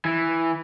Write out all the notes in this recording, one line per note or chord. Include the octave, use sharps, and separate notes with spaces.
E3